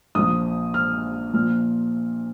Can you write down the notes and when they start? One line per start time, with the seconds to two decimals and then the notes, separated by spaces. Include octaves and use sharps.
0.15 A#1 A#2 F3 D#6
0.74 F6
1.33 A#2 F3 F6